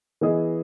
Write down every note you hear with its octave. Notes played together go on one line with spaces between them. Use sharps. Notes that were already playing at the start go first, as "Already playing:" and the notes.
E3 B3 E4 G#4 D#5